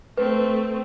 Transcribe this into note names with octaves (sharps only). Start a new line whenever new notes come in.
A3 C4 B4